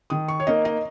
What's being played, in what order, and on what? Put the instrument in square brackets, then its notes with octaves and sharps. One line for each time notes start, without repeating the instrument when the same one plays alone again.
[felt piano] D#3 D#6
C#6
C#5
A#3 D#4 D#5
D#5